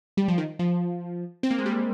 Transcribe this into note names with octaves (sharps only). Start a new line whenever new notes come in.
G3
F3
D#3
F3
C4
A#3
G#3
G3